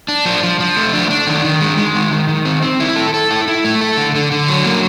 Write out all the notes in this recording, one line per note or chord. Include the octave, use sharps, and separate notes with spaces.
D4
F3
F3
F3
A3
D4
D4
D#3
D#3
G#3
G#3
D#3
D#3
D#3
C4
C4
E4
A4
A4
E4
E4
A3
A4
D3
D3
D3
F#3
A#3